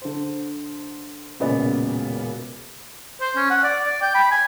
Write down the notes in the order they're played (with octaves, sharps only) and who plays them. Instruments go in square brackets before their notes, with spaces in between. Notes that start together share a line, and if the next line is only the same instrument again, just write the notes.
[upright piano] D3 C5
E1 A#2 C#3 B3 D5
[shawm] C5
C#4
F#5
D5
D5
G5
B5
G#5